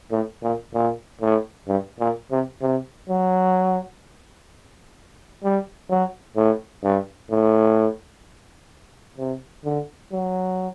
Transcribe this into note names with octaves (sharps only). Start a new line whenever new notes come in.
A2
A#2
A#2
A2
G2
A#2
C3
C3
F#3
G3
F#3
A2
G2
A2
C3
D3
F#3